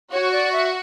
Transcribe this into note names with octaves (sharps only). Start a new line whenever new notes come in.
F#4 C#5
D5
E5